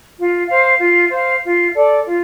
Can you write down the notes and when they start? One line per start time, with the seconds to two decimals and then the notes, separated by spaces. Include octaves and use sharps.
0.18 F4
0.48 C5 F5
0.80 F4
1.11 C5 F5
1.43 F4
1.74 A4 D5
2.05 F4